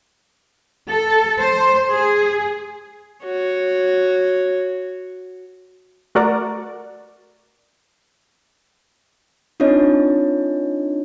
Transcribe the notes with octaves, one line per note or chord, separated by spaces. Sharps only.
A4
C5
G#4
F#4 C#5
A3 F#4 A#4 D5
C4 D4 D#4 F4 C#5 D#5